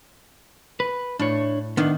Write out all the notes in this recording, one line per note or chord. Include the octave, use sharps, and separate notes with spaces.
B4
A2 D4 C#5
D#3 B3 D4